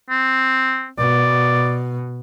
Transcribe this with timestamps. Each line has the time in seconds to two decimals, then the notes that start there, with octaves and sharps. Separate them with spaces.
0.10 C4
0.98 B2 D5